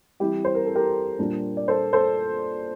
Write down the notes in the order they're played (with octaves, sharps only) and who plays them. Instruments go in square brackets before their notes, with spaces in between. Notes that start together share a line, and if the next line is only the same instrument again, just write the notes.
[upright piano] E3 G3 C4 E4 G4
C5
A#4
A4
G4 A#4
A#2 G3 A#3 D4
D5
A4 C5
A4 C5